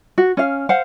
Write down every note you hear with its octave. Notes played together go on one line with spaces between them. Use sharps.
F#4
C#4 F5
C5 F5 F#5